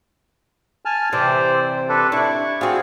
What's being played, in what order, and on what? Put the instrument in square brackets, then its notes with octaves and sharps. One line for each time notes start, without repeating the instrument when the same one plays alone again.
[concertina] G#5 A5 F6
[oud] C3 E3 [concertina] C5 D5
[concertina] D4 A4 B4
[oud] D4 [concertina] E4 C#6
[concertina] C4 G#4 [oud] F4 F#4